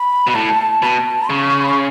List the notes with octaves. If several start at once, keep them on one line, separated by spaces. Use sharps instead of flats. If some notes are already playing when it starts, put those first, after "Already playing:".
Already playing: B5
B2
A2 A5
B2 A5 B5
C#3 C#6
B5
C#6